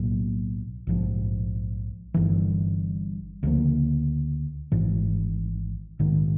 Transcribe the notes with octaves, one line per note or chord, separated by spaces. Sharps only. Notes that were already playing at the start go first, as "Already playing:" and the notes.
Already playing: B1 A2 F#3 A#3
A#1 G#2 F3
G1 G2 E3
D2 C#3 F3 A#3
G#1 G#2 E3
A#1 G#2 D#3